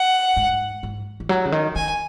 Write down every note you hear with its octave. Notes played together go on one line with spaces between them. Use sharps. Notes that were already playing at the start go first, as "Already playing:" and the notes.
Already playing: F#5
G#2
G#2
D#3
F#3
C#3
D#3
D#3 G#5